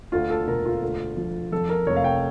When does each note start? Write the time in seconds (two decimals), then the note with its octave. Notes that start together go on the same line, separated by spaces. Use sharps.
0.12 D2 F4
0.30 A4
0.47 E1 A#4
0.65 F4
0.82 D2
1.17 F3
1.52 F2 A4
1.69 A#4
1.87 F1 C#5
1.96 F5
2.04 G5